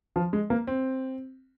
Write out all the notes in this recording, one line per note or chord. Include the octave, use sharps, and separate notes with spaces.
F3
G#3
A#3
C4